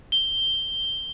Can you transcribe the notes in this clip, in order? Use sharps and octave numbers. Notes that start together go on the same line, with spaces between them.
G7